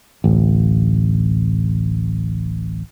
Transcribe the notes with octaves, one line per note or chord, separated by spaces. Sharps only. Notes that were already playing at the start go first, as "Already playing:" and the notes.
D1 A1